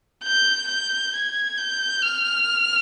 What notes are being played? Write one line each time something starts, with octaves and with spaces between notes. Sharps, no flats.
G6
G6
G#6
G6
F6